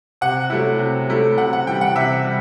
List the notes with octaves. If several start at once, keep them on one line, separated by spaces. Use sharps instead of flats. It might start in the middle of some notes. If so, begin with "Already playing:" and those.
C3 F#5
F#3 A3 E4
C3
F#3 A3 E4
C3 F#5
F#5
E3 G3 G5
F#5
C3 E5
G3